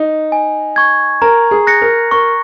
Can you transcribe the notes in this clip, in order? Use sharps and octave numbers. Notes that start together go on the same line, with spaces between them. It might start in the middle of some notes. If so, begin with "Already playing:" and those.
Already playing: D#4
G#5
C#6 G#6
A#4 A#5
G#4
F#6 A#6 C#7
A#4
A#4 C#6